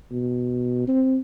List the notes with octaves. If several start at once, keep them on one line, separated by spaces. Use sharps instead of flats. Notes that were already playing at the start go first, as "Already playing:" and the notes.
B2
C4